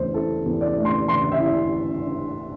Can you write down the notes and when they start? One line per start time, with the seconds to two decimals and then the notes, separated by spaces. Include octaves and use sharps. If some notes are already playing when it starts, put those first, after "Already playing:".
Already playing: E2 E3 A3 C5
0.14 E4 A4
0.45 E2
0.61 D5
0.77 A3
0.85 C6
1.08 E3 C6
1.32 E5
1.40 E4